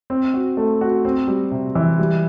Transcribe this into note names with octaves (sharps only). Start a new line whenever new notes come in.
C4
F#4
A3
F#4
C4
G3
C3
E3
G3